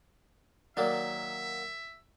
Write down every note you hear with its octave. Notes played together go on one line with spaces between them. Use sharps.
D#3 F#3 A#3 D5 E5